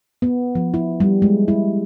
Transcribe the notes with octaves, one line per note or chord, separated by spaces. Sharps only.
B3
F3
E4
G3
G#3
E4